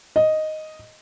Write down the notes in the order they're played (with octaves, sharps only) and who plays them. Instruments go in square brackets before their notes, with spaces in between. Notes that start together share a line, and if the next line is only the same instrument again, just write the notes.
[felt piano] D#5